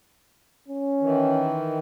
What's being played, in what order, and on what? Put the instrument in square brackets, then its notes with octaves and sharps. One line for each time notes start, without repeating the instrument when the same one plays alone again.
[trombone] C#4
[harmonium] D#3 E3